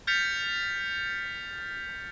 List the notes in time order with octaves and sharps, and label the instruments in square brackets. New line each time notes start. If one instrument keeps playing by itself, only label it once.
[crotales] F6 G6 A6 B6 C#7 F7